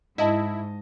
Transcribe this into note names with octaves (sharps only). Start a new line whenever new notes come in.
G#2 E4 D#5 A5